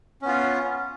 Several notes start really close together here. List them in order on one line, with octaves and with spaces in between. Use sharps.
C#4 B3 F4